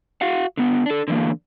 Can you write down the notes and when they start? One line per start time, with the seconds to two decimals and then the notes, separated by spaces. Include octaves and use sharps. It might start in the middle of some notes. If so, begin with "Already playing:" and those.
0.21 F#4 F5 F#5
0.57 D3 B3
0.86 D4 A4
1.08 D3 E3 A#3